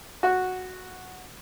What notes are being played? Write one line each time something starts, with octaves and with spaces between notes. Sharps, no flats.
F#4